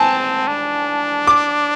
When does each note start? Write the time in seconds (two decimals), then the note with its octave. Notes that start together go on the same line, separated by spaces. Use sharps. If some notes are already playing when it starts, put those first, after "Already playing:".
Already playing: C4 G#5 A5
0.48 D4
1.27 D6